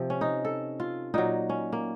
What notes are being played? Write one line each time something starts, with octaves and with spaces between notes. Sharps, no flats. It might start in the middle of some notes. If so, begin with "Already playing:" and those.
Already playing: C3 F3
C#4
D#4
A4
F4
A#2 F#3 D#4
C#4
A#3